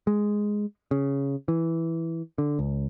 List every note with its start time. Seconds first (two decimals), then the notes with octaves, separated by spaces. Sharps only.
0.07 G#3
0.91 C#3
1.48 E3
2.38 D3
2.59 C#2